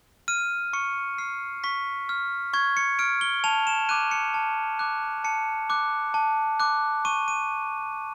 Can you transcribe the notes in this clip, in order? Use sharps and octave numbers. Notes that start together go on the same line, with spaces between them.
F6 D#7
C#6 C#7
F6 C7
C#6 B6
F6
C#6 G#6
C#7
F6 D7
G7
A5 F7
E7
D6 F#6 D#7
C#7
A5
D6 F#6
A5 C#7
D6 F#6
A5
D6 F#6
C#6 D#7
D#7